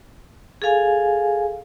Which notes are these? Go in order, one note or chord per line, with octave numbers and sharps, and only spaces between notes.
G#4 A4 F5 G#5